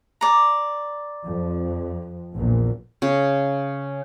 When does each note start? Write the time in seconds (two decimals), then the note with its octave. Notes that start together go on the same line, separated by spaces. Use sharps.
0.21 D5 A#5
1.24 F2
2.35 A#1 E2 A#2
3.02 C#3